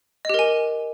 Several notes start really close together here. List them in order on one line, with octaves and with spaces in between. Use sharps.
D#5 G4 A#4 G#5